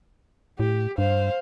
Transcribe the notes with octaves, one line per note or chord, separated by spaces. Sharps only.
A2 G4
G2 C5 F5